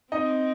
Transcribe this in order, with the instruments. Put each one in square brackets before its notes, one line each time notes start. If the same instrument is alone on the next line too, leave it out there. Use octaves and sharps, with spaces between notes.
[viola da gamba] C4 [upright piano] D#4 D#5